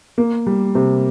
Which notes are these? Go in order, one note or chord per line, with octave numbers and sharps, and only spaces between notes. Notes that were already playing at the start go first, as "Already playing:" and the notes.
A#3
G3
C3